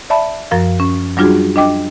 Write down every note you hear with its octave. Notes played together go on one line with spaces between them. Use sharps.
D5 E5 A5 B5
F#2 F3 A#4 F5
C#4
F#3 G3 D4 F4 F#4 G#4
D4 D#5 G5 D6